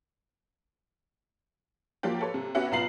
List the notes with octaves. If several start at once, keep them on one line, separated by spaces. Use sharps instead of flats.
F3 F#3 A#3 G4
A4 B4 C#5
C3
B3 C#4 F#4 G4 E5 F#5
B1 B3 F4 A#5 C7 F#7